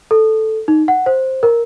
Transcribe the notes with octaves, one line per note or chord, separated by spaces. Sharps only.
A4
D#4
F#5
C5
A#4